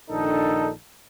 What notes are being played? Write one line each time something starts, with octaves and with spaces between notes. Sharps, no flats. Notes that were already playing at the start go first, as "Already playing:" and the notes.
A#1 D#3 D4 D#4 A4